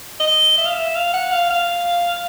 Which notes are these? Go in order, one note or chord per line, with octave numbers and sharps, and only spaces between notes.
D#5
E5
F5
E5
F5
F#5
F5
F5